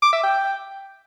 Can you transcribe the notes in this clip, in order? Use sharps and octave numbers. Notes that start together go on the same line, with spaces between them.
D6
E5
G5